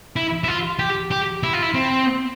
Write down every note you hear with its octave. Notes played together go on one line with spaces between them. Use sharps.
E4
E4
F4
G4
G4
E4
F4
E4
C4